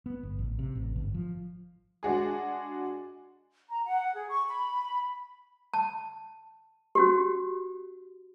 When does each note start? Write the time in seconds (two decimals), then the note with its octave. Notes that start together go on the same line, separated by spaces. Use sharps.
0.06 B3
0.23 G1
0.39 A1
0.59 C3
0.75 A1
0.96 G1
1.14 F3
2.03 G#3 D4 F#4 G#4
3.70 A#5
3.86 F#5
4.14 G#4
4.29 C#6
4.47 B5
5.74 A5
6.95 C#4 F#4 G4